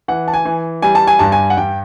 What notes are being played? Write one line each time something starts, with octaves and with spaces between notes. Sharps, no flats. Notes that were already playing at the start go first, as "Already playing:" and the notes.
E3 F#5
A5
G#5
E3
G3 G#5
A5
G#5
G2 A5
G#5
F#5
G2 G5